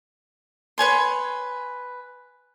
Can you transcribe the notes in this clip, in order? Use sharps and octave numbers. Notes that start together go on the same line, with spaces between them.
B4 C#5 G#5 C6